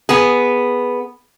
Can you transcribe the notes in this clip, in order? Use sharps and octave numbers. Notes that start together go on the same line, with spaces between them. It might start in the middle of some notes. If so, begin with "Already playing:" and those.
B3 G#4